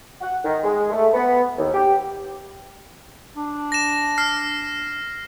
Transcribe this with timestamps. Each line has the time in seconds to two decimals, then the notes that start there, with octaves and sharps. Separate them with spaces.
0.21 F#5
0.44 D#3
0.64 G#3
0.92 A3
1.14 B3
1.58 D#2
1.74 G4
3.36 D4
3.72 A#6 E7
4.18 F6 C7